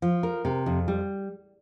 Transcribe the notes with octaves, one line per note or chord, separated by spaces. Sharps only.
F3
A#4
C3
F2
G3